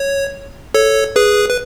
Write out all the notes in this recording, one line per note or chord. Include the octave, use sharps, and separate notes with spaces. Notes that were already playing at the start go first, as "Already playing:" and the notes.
Already playing: C#5
A4 C#5
G#4 B4
B4